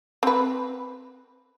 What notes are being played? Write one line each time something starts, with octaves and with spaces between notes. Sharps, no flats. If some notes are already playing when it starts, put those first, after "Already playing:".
C4 B4